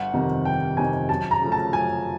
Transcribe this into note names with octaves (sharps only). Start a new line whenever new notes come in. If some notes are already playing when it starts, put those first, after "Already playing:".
Already playing: G1 F#5
F2 C3 D#3
G1 G5
F2 C3 D#3 G#5
F#2 A5
A#5
C#3 F3 A3
A5
F#2 G#5